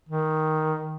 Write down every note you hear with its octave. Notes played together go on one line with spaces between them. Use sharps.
D#3